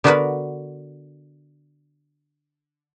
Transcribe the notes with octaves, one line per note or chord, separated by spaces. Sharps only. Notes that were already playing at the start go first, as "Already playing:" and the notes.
D3 B3 D4 F#4 A#4 B4